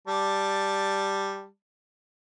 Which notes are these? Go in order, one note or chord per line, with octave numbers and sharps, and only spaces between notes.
G3 D5 A5